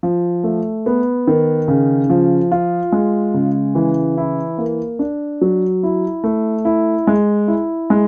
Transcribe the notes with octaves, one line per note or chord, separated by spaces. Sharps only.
F3
A3
B3
D#3
C#3
F3
F4
G#3
C#3
E3
E4
A#3
D4
F#3
E4
A3
E4
G#3
E4
G#3